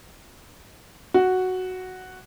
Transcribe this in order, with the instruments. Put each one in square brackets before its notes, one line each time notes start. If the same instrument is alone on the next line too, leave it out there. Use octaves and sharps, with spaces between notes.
[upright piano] F#4